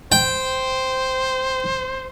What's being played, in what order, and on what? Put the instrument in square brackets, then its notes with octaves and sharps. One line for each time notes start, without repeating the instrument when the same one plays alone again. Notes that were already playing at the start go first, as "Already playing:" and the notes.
[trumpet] C5 [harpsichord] G5